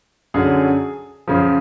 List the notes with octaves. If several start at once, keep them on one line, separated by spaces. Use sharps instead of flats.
F#2 D3 F#3 G#4
F#2 C#3 F3